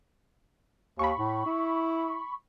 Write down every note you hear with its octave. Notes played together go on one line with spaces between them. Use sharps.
D#2 B5 C#6
A2
E4